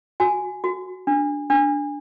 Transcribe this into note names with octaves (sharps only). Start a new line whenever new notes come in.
F#4 G#5
F#4
D4
D4